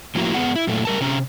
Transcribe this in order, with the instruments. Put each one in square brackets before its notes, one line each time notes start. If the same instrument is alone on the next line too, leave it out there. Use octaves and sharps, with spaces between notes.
[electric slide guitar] A2 F3 A#3 E4 F#4 A#5
G#2 B3 G#4 F#5
E4
F#2 A#2 A3
G3 A#4 A5
C3 C#4 A#5